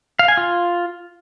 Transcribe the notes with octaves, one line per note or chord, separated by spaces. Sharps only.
F5
G#5
F4